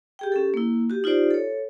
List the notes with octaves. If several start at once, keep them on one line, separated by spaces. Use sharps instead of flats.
G4 G#4 G5
C#4 G4 A4
A#3 E4
F#4 G4
D#4 F4 G4 C5 D5
A4 C#5